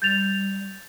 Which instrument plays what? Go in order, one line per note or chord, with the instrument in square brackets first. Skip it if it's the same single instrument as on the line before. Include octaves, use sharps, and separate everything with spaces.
[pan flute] G3 [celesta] G6 A6 F7